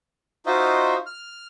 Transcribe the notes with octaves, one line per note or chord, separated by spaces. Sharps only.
D#4 F4 F#4 C5 D#5 E5
F6